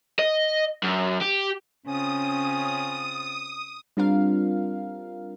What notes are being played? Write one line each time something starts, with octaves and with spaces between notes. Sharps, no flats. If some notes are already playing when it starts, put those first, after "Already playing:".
D#5
F#2
G4
C#3 C4 C#4 F4 D#6
G3 C4 D4 F4 A#4 F5